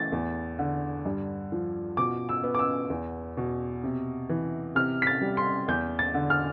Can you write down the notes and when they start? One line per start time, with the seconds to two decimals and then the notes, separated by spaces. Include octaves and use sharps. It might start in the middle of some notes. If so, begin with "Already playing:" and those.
Already playing: A2 E3 A6
0.12 E2
0.59 D3
1.05 G2
1.52 F3
1.97 B2 D6
2.29 E6
2.43 B3
2.55 D6
2.59 E6
2.90 E2
3.37 B2
3.84 C3
4.29 E3
4.75 C3 F6
5.02 B6
5.07 A6
5.21 G3
5.37 C6
5.68 E2 G6
5.99 A6
6.14 D3
6.30 F6